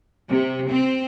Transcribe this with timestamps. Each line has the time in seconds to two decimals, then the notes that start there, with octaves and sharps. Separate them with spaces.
0.29 C3
0.70 C4